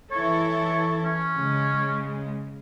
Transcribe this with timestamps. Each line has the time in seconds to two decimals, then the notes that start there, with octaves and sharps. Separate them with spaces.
0.11 E3 E4 A4 C#5
1.03 C#4
1.37 C#3 G#3